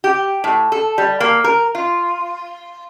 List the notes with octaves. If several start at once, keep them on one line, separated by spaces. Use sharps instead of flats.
G4
A2
A4
G3
A#3
A#4
F4